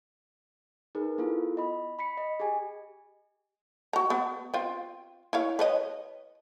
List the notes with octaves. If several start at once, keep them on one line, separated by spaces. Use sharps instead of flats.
D#4 G#4 A#4 B4
B3 E4 F4 A4
D#5 B5
B5 B6 C#7
D#5
G4 G#4 G#5
F#4 A#5
B3
C4 F4
E4 C#5 F5
B4 C#5 D#5